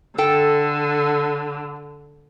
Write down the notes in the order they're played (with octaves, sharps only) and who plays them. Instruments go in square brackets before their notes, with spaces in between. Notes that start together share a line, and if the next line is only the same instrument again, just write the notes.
[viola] D3 [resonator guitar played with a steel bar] A4 G5